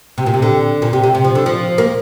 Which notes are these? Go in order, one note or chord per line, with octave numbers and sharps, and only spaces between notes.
C3
A#2
C3
D3
A#2
C3
C3
C3
F3
D3
F3
A#3